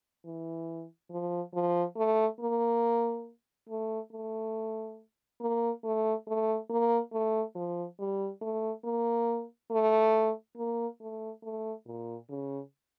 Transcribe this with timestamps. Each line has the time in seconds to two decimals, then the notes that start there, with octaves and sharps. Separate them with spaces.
0.25 E3
1.11 F3
1.54 F3
1.96 A3
2.40 A#3
3.69 A3
4.12 A3
5.40 A#3
5.84 A3
6.27 A3
6.70 A#3
7.13 A3
7.55 F3
7.99 G3
8.41 A3
8.84 A#3
9.71 A3
10.57 A#3
11.01 A3
11.43 A3
11.86 A#2
12.30 C#3